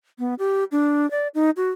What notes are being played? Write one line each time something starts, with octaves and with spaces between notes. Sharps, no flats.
B3
G4
D4
D5
D#4
F#4